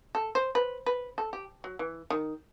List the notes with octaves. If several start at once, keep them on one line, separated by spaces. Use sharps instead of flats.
A4
C5
B4
B4
A4
G4
F#3
E3
D#3